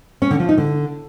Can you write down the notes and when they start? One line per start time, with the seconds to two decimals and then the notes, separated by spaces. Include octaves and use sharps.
0.22 C#4
0.31 D3
0.40 F3
0.49 D#4
0.58 D3